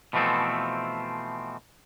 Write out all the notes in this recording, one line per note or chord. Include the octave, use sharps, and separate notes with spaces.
B2 E3 F3 A3 C4 A4